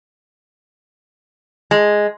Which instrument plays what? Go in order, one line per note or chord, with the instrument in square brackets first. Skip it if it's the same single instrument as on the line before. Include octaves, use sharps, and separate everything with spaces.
[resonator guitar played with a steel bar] G#3